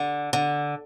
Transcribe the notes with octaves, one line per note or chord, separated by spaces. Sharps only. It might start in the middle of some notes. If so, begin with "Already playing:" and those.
Already playing: D3
D3